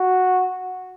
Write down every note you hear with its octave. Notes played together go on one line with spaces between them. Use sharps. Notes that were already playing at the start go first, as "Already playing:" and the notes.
Already playing: F#4